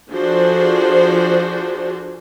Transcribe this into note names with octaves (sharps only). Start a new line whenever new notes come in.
F3 D4 F#4 G#4 A4 C5